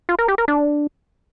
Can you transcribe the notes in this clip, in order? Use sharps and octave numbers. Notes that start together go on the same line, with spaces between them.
F4
A#4
G4
A#4
D4